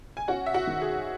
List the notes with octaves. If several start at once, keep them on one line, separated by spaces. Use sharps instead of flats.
G#5
C#4 F#4 F#5
E5
F#4 F#5
D#3
G#4